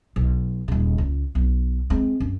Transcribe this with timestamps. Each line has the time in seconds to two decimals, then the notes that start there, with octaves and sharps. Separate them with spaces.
0.16 B1
0.68 D#1 C#3
0.98 C#2
1.35 B1
1.90 G#3 C4
2.20 F#2